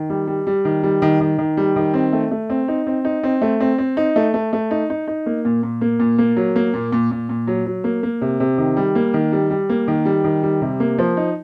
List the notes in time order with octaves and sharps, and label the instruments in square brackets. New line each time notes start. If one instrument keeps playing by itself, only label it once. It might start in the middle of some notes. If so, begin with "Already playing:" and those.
Already playing: [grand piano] D#3
G3
G3
G3
D#3
G3
D#3
D#3
D#3
G3
D#3
C4
A3
A3
C4
D#4
C4
D#4
C4
A3
C4
C4
D#4
A3
A3
A3
D#4
D#4
D#4
A#3
A#2
A#2
A#3
A#2
A#3
F#3
A#3
A#2
A#2
A#2
A#2
F#3
F#3
A#3
A#3
C3
C3
D#3
G3
A#3
D#3
G3
G3
A#3
D#3
G3
D#3
G3
C3
A#3
F3
D#4